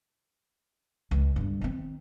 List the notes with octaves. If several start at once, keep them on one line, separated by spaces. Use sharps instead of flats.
C#2
G2 D3
D#3 C4